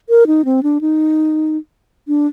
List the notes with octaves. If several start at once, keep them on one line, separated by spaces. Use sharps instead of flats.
A#4
D#4
C4
D4
D#4
D4